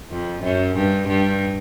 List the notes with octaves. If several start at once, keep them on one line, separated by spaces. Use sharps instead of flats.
F2
F#2
G2
G2